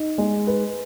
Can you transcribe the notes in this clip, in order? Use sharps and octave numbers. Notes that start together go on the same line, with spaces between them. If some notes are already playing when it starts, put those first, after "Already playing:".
Already playing: D#4
G#3
B4